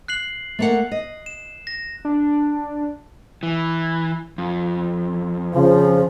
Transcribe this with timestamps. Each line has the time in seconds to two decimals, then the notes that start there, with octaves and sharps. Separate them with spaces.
0.08 F#6 C7 F#7
0.59 A3 A#3 F#5
0.91 D#5
1.26 E7
1.67 A#6
2.05 D4
3.43 E3
4.38 F2
5.54 C#3 F3